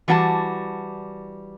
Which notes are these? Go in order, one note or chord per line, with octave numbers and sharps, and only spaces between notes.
E3 G3 F#4 G5 A5